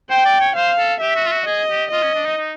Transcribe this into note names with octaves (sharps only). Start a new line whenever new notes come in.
C5 G5
D5
C#5
C5 F5
A4
G4 E5
F#4
F4
F#4
G#4 D#5
G4
F4 D#5
C#4
D4
D#4
D#4